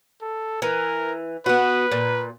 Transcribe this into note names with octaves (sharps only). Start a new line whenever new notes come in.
A4
E3 A#4
B3 F#4 B4
A#2